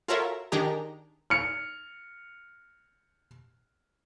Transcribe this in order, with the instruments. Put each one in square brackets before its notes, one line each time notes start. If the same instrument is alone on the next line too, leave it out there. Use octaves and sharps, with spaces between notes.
[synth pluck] F4 F#4 A4 A#4 C#5 E5
D#3 D4 D#4 G4 G#4 A#5
[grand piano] F6 C#7